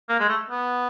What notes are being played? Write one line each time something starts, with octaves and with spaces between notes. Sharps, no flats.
A#3
G#3
A3
B3